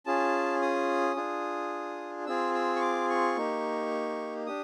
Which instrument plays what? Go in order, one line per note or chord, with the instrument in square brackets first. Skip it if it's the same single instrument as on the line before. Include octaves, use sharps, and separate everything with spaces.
[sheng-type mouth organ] C#4 F4 G#4 A5
D#6
D4 F4 G#4
C4 F4 G#4 E6
E6
C#6
D6
C#6
A#3 D#4 G4
D4 G4 D#6